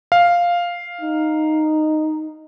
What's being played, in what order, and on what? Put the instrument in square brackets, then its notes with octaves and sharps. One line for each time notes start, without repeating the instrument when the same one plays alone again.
[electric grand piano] F5
[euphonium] D#4